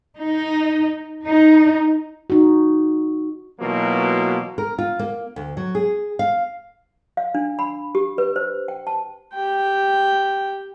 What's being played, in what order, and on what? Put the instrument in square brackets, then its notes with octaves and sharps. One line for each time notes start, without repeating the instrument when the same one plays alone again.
[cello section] D#4
D#4
[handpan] D#4 F#4
[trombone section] B2 E3 F#3 A#3 F4
[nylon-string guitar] A#4
F4
A#3
D2
F#3
G#4
F5
[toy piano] F5
D4
B5
G4
B4
C5
G5
A5
[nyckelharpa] G4 G5